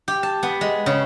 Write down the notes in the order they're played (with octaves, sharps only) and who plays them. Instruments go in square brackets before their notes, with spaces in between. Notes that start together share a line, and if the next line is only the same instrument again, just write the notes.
[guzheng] G4
A5
B3
G#3
C#3